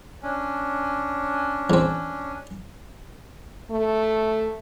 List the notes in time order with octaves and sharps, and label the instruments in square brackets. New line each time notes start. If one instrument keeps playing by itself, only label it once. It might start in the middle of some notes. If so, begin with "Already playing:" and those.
[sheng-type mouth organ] C#4 D4
[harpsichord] E2 C4
[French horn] A3